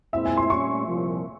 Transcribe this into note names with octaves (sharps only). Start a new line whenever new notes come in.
A#2 G#3 C4 E4 E5
G#5
C6
A#2 G3 C#4 C#6
C2 A#2 F3